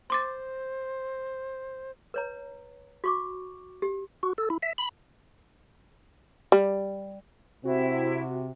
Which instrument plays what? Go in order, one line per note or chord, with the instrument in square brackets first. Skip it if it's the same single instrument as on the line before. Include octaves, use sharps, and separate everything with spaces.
[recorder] C5 [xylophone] C6 D6 A6
[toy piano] B4 C#5 A#5
F#4 C#6 D6
G4
[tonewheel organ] F#4
A4
E4
E5
B5
[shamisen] G3
[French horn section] C3 [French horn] C4 [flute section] E4 [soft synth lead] F#4